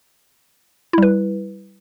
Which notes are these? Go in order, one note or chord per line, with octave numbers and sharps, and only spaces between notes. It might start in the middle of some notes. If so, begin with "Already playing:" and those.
G3 E4 B4